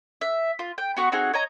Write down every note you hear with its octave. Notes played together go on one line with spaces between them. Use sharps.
E5
F4
G5
B3 F#4 C#6
C4 D#4 F#4 G#4
C#5 D#5 A#5